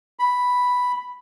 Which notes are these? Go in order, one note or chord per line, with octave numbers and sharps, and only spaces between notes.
B5